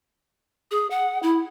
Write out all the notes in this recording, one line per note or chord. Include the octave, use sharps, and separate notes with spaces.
G#4
F#5
E4